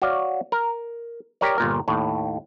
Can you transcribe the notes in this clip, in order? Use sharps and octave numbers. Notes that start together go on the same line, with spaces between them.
F#4 C#5 D5 F5
A#4
G4 A#4 C#5 D5
G1 A#2 A#4
D#2 A2